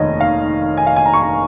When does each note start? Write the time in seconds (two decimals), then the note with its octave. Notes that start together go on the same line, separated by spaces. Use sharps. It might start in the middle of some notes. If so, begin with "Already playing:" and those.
Already playing: F1 D#2 D#3 C#5 D#5
0.20 F5
0.77 G#5
0.87 F5
0.96 G#5
1.06 A#5
1.13 C#6
1.22 A#5